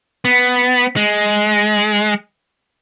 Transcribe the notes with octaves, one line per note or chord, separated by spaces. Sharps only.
B3
G#3